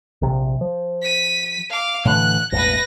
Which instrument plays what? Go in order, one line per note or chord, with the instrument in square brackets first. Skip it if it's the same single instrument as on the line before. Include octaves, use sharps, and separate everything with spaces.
[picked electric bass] A#1 C3
F3
[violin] B6 D#7
F5 D6
[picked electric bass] A2 D3 E3 [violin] F#6
[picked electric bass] E1 A1 [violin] B4 A#6